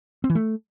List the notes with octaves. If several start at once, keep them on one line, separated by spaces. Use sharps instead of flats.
C4
E3
A3